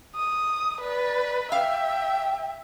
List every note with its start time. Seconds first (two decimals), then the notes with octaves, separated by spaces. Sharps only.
0.15 D#6
0.81 B4 D5
1.52 E5 F5 G5